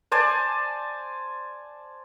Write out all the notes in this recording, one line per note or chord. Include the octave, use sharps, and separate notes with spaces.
C5 D5 G#5 A5